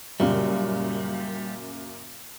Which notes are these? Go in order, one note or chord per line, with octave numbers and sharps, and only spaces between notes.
F#2 A#2 C#3 G3